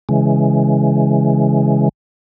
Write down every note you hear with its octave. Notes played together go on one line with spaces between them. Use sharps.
C#3 E3 G#3